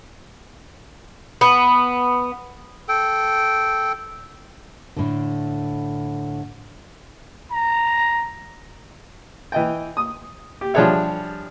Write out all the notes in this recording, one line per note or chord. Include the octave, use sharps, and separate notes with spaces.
B3
A4 G5
A2 D3
A#5
E3 D#5 G5
D#6
G4
F3 G3 D4 G#4 C#5 E5